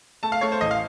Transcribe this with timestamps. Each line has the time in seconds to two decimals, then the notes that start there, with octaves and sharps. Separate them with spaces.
0.23 A3 A5
0.32 F5
0.41 A3 C#5
0.52 C5
0.61 A1 D#5
0.71 F5